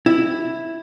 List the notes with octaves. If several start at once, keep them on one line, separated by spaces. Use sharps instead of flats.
E4